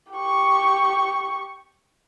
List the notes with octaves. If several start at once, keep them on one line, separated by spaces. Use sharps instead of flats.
G4 C#6